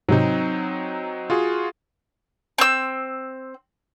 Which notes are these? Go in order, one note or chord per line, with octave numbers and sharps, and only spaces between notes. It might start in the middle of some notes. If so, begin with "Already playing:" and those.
G#2 C3 F#3 C4 D#4
F4 F#4 G#4
C4 E6